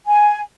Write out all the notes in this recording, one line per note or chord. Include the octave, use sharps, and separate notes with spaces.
G#5